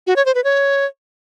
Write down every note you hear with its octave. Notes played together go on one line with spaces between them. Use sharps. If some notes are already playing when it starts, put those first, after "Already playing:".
F#4
C#5
C5
B4
C#5